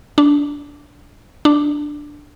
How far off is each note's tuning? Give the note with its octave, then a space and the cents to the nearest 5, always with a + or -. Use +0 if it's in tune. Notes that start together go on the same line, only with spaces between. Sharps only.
D4 -15
D4 +5